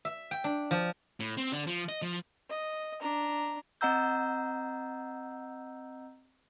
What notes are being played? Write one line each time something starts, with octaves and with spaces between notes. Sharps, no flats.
E5
G5
D4
F3
A2
C4
D3 D4
F3
D#5
F3
D#5
D4 A#5
C4 D#5 F#5 A#5 E6 G6